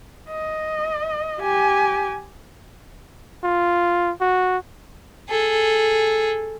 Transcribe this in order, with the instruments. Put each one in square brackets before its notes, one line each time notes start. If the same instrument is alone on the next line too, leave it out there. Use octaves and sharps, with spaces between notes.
[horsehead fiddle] D#5
G4 G#5
[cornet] F4
F#4
[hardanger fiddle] G#4 A4